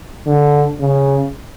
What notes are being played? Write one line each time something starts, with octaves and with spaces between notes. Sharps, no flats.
D3
C#3